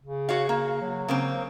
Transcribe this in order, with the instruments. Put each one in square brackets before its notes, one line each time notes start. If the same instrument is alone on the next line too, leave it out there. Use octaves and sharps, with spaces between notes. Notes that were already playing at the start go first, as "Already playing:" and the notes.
[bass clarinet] C#3
[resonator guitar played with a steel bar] F#4 C#5 F5
A#3
[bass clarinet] F#3
[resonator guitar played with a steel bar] C#3 A#3 C4